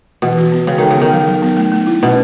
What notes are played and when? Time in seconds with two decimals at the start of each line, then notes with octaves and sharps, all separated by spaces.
0.22 B2 E3
0.37 F#4
0.52 B3
0.67 C#3 G#3
0.78 D#3 A4
0.90 C#3
0.97 D#3 B3
1.13 F#3
1.27 F#3
1.42 B3
1.57 A3
1.72 A3
1.87 E4
2.03 B2 C#4